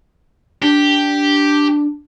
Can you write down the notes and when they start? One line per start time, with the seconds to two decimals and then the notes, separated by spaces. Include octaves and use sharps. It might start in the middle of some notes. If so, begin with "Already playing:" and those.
0.63 D4 G4